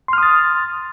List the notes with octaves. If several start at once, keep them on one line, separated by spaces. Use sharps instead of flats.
C6 D#6 F6 A6